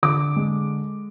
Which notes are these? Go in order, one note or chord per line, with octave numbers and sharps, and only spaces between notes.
D3 D6
G#3